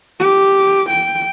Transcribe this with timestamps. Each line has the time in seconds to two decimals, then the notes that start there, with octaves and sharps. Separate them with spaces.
0.20 G4
0.90 G5